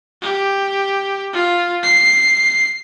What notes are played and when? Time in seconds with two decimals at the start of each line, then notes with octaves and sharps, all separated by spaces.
0.22 G4
1.33 F4
1.83 C7